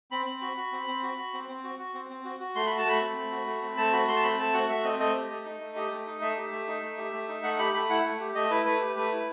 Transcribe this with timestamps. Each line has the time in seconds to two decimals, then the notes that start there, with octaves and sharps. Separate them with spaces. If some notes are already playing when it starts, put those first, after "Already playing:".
0.11 C4 B5
0.26 C4
0.41 F#4
0.57 F#4
0.72 C4
0.87 C4
1.03 F#4
1.18 F#4
1.33 C4
1.48 C4
1.64 F#4
1.79 F#4
1.94 C4
2.09 C4
2.25 F#4
2.40 F#4
2.55 A3 C6
2.66 F#4 B5
2.78 A5
2.86 A3 B5
3.01 C4
3.16 A3
3.31 F#4
3.47 A3
3.62 C4
3.77 A3 A5
3.92 F#4 B5
4.08 A3 C6
4.16 A5
4.23 C4 B5
4.38 A3 A5
4.54 F#4 F#5
4.69 A3 E5
4.84 C4 D#5
4.99 A3 D#5
5.15 G4
5.30 A3
5.45 D#4
5.60 A3
5.76 G4
5.91 A3
6.06 D#4
6.21 A3 E5
6.37 G4
6.52 A3
6.67 D#4
6.83 A3
6.98 G4
7.13 A3
7.28 D#4
7.43 A3 F#5
7.59 G4 B5
7.74 A3 B5
7.89 E4 F#5
8.05 A3
8.20 G4
8.35 A3 D#5
8.51 E4 B4
8.66 A3 B4
8.81 G4
8.96 A3 B4
9.12 E4